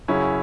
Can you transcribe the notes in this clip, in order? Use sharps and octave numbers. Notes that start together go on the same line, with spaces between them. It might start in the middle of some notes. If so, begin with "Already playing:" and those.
F#2 C#3 F#3 C#4 E4